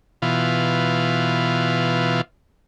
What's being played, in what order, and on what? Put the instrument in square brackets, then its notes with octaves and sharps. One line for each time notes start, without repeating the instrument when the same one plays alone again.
[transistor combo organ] B2 E3 F4